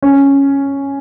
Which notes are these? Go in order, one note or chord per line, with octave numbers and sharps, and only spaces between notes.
C#4